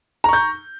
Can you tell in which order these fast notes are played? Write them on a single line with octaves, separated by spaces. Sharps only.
A#5 C#6 G6